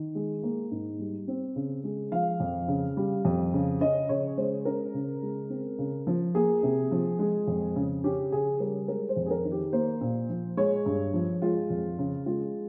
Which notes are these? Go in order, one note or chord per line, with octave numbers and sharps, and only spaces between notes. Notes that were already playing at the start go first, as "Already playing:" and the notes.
Already playing: D#3
G#3
A#3
G#2
G3
C4
C#3
G#3
F3 F5
F2
C#3
G3
F2
C#3
C#4 D#5
C#3 C#5
G#3 C5
C#4 A#4
C#3
G#3
C4
C#3
F3
A#3 G#4
C3
F3
G#3
F2
C#3
C#4 G4
C#3 G#4
G3 A#4
G#3 A#4
C5
F2
G#4
A#4
D#3
G4
A#3 C5
A#2
F3
G#3 C#5
G2
F3
G#3 F4
F2
C#3
G#3 F4